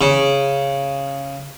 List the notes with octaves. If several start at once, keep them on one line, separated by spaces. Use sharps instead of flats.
C#3